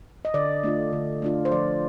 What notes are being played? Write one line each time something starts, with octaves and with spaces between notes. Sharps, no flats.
D#5
D3 D5
A3 D4 F4
D3
A3 D4 F4
C5
F3 D5